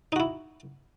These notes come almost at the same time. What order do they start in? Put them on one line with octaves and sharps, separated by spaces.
D#4 F#4 E4